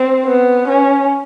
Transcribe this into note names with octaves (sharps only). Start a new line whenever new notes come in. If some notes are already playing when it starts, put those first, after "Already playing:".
Already playing: C4
B3
C#4